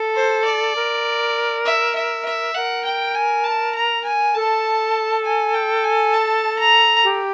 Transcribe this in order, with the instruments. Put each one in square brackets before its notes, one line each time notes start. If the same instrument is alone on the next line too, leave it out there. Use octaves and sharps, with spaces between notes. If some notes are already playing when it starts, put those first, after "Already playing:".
Already playing: [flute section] A4
[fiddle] C5
D5
[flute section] A#4
[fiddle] E5
E5
E5
[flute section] A#4 [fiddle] F#5
[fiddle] G5
G#5
A5
A#5
G#5
[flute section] A4 [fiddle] A5
[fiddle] G#5
G5
G#5
A5
A#5
[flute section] G4